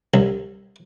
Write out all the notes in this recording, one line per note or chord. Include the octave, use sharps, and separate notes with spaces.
C2